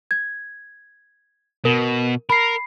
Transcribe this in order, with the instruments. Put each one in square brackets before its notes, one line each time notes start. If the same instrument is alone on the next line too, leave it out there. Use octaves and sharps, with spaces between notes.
[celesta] G#6
[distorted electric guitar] B2 [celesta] A#4
[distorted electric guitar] A#4 [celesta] B5 C7